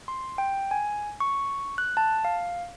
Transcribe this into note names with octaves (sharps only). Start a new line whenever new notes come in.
C6
G5
G#5
C#6
F#6
A5
F5